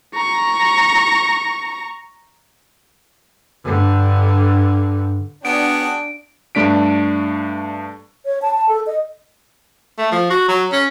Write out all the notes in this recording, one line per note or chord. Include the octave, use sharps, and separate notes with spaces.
A#5 C#6
G2 D3
B3 D4 F#4 G#4 G5 D7
G2 A3 D4 B6 D7
C#5
A5
A5
A4
D#5
A3
F3
F#4
F#3
C#4